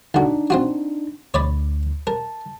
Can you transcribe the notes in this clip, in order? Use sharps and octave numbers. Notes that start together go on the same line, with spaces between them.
D2 D4 D#4 F#4
C4 F4 F#4
D2 C#5 D5 B5
A#4 A5